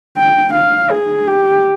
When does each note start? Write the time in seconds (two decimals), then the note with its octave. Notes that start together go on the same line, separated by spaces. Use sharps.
0.17 G5
0.54 F5
0.91 G#4
1.27 G4